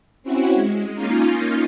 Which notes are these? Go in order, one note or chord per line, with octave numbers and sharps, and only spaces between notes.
C4 C#4 E4 F#4
G#3
A#3 C#4 D#4 F4